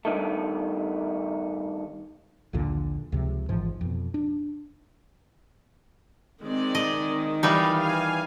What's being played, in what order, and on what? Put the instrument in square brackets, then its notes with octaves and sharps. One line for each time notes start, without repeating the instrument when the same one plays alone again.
[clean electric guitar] G2 D#3 A3
[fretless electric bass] A#1 D#2 A#2 D3
C#2 C3 F3
G#1 G#2 E3 F3
F2 B2
D4
[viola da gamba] D#3 [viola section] G#3 C4 D5
[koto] D#5
[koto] E3 G3 D#4 [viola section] F4 G4 F5
[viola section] F5 G#5